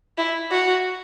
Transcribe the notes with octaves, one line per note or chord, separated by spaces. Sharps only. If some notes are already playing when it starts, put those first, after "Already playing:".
E4
F#4